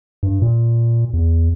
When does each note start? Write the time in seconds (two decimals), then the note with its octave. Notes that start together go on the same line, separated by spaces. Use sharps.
0.23 G2
0.42 A#2
1.13 E2